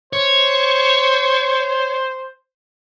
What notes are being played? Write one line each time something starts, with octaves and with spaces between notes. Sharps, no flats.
C5 C#5